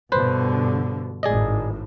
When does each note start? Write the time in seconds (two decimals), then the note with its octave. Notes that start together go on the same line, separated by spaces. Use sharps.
0.12 G2 B2 D3 B4 C5
1.23 G#1 A2 G#4 D5 D#5